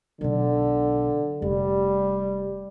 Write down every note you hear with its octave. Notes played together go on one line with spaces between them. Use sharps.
B1 B2 D3
F1 G3